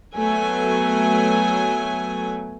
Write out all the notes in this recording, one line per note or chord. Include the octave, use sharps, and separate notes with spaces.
F#3 A3 B3 G#5